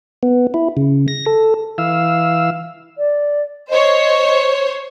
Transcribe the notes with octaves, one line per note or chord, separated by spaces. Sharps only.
B3
E4
C#3
A#6
A4
E3 F5 E6
D5
C5 C#5 D#5